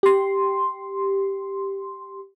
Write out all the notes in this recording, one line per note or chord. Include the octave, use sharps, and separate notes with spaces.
G4 C6